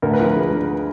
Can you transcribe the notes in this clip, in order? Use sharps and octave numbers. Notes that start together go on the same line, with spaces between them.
D2 A#4
B4
F3 A#4
G#3
D3